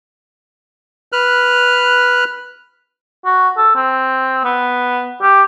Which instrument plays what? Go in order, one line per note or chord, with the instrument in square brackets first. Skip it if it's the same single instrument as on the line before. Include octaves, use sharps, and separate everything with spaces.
[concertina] B4 F6 F#6
[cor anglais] F#4
A4
C4
B3
G4